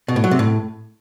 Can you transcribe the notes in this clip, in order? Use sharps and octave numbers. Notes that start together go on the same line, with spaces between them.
B2
A2
F#3
C3
A2